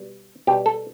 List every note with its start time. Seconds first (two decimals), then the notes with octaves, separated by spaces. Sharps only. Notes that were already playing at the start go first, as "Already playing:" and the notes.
Already playing: B2 G3
0.47 B2 G3 G4
0.66 A4